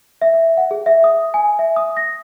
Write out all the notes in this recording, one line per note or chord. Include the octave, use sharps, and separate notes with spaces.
E5
E5
F#5
G#4
E5
D#6
G#5
E5
D#6
A#6